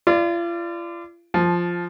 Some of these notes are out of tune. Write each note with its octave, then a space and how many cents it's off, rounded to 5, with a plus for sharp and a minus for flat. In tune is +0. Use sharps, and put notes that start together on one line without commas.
F4 -40 D5 +5
F3 +0 A5 -25